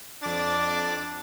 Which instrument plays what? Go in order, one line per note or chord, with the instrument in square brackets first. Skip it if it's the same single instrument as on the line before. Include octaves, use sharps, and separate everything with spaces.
[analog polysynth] F2 D6 A6 [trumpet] D4